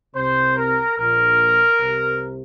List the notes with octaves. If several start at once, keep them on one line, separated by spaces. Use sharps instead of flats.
C2 C3 C5
A#4
A#1 A#2 A#4
C2 C3